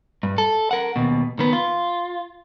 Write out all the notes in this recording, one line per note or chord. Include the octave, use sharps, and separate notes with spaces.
G2
A4
A#4 F#5
D#2 B2
D#3 B3
F4